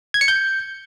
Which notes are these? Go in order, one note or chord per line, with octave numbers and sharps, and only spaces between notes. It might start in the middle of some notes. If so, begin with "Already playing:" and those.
G#6
C#7
G6